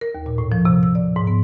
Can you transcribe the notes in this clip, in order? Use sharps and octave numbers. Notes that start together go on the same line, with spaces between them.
A#4
D#2
A#2
A2
F3
C3
E6
D5
G#2
B3